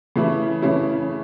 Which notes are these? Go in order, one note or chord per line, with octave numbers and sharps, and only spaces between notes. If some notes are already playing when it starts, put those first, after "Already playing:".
C#3 E3 A3 C#4 E4
C#3 E3 A3 C#4 E4